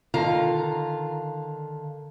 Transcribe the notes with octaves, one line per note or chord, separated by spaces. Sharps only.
D3 D#3 F4 F5 A#5